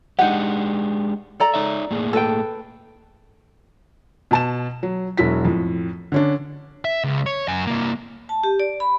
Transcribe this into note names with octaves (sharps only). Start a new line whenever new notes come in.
G#3 D4 D#4 G4 F#5
A4 D5 A#5
D#4 C#5 E5
A2 A#3 G#4
A4 B4 G5
B2 A5 E7
F#3
E1 F#3 E4 F#4 B6
F2 A2
D3 C#4 D4
E5
C#2
C#5
F#2 G#5
C2 A#3
A5
G4
D5
B5